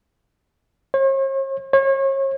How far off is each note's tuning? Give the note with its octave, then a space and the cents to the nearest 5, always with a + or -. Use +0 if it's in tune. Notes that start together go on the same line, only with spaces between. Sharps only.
C#5 -45
C#5 -35